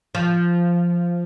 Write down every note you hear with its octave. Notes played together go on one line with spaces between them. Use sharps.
F3